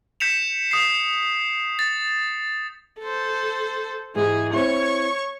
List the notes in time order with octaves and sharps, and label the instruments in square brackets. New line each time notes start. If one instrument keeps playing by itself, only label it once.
[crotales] G6 B6 C#7 E7 F7
D#6 C7
A6
[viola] A4 C5
[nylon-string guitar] G#2 E4 G4 [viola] E3 G#4
[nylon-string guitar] C4 E4 [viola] C#5 C#6